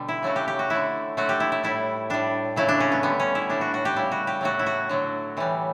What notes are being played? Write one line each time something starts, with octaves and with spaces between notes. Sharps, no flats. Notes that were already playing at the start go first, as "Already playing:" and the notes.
Already playing: B2 D3 G3
E4
C#3 F#3 A3 F#4
G4
G4
F#4
D3 A3 E4
D3 F#3 A3 F#4
G4
E4
E4
A2 G3 E4
A2 G3 D4
C#3 F#3 A3 E4
D4
C#4
B3
D3 G3 B3
C#4
E4
A2 G3 D4
F#4
F#4
G4
C#3 G3 E4
F#4
G4
A2 F#3 A3 F#4
E4
F#4
D3 F#3 A3
A2 E3 G3